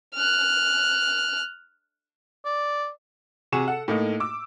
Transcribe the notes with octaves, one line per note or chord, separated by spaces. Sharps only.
F6 F#6
D5
C3 F#4 G#4 C#6 E7
A4 F#5
A2 A3 A#3 D#4
D6 E6